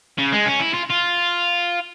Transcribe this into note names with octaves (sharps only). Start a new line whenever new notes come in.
C#3
G#3
C#4
E4
F4
F4